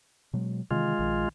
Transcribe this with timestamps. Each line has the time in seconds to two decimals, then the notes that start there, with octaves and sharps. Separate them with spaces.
0.33 B2 F#3 G#3
0.71 C3 D#3 E3 G#3 F4
0.99 A#1 D#3